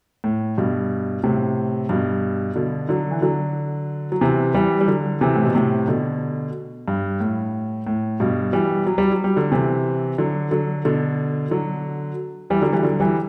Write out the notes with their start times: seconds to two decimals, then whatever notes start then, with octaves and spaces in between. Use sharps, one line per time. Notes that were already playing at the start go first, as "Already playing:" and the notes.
0.24 A2
0.58 G2 B2
1.24 A2 C3
1.89 G2 B2
2.56 B2 D3
2.89 D3 F#3
3.11 E3
3.22 D3 F#3
4.12 F#3
4.21 C3 E3
4.54 E3 G3
4.81 G3
4.88 D3 F#3
5.21 C3 E3
5.36 A2
5.45 B2
5.54 A2 C3
5.88 B2 D3
6.88 G2
7.20 A2
7.87 A2
8.20 G2 B2
8.53 E3 G3
8.87 F#3
8.98 G3
9.11 F#3
9.24 G3
9.36 D3 F#3
9.52 C3 E3
10.18 D3 F#3
10.51 D3 F#3
10.85 B2 D3
11.51 D3 F#3
12.50 E3 G3
12.62 D3 F#3
12.72 E3 G3
12.83 D3 F#3
13.00 E3 G3